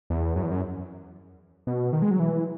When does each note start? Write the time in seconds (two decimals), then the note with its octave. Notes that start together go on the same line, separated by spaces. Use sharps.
0.10 E2
0.36 F#2
0.43 E2
0.51 F#2
1.67 B2
1.93 D#3
2.02 G#3
2.11 F#3
2.20 E3